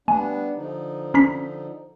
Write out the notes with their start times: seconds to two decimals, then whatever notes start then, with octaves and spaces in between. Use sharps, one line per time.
0.08 G3 A3 B3 D4 G#5
0.56 D3 F3 D#4
1.14 C#4 A#5 B6